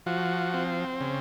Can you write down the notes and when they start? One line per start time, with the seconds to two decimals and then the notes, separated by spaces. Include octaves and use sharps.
0.06 F3 F#4
0.54 C4
1.01 C#3